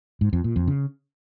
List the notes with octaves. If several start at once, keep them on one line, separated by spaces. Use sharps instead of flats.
G#2
F2
A#2
F2
C#3